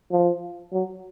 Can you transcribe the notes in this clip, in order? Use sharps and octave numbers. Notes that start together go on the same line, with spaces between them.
F3
F#3